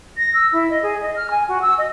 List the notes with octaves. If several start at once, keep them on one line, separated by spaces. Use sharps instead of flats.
A#6
E6
E4
D#5
G#4
D#5
F6
G#5
F#4
E6
D#5